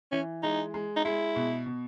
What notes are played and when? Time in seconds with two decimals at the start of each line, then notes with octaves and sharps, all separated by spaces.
0.12 E3 C#4
0.43 G#3 D#4
0.74 G#3
0.96 D#4
1.05 G#3 E4
1.36 B2
1.66 B2